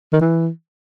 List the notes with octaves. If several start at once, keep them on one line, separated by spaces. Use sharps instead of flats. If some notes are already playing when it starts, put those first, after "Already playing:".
D#3
E3